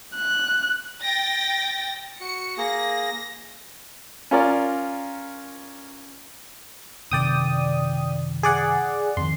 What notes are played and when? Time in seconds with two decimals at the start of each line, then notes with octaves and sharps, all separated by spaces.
0.15 F#6
1.01 G5 A6 A#6
2.21 F#4 C#7
2.57 A#3 G#4 A#6
4.31 C#4 F4 A#4 D5
7.11 F#1 C3 D#3 D5 G5 D#6
8.43 G#4 D5 F#5
9.17 F2 D#3 C6